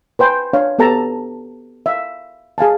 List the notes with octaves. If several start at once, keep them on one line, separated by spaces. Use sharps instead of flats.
B4 C5 G5 G#5
D4 C#5 F5
B3 G4 A4 A5 A#5
E5 F5
G#4 F5 G#5 A5